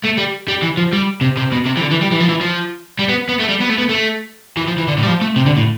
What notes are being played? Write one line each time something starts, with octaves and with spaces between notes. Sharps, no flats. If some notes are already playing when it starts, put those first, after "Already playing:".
A3
G3
G3
E3
F3
G3
C3
C3
B2
C3
E3
D3
E3
G3
E3
F3
E3
F3
G3
B3
B3
A3
G3
B3
A3
B3
A3
E3
F3
E3
D3
A2
G3
F3
A3
C3
D3
A2